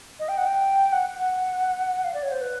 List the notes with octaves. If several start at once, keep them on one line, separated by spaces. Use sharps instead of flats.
D#5
G5
F#5
G5
F#5
F#5
F5
D5
C#5
C5
B4